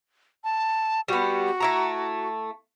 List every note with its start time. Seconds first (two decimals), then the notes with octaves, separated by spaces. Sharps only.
0.44 A5
1.08 G3 B3 F#4
1.60 A3 E4 A#5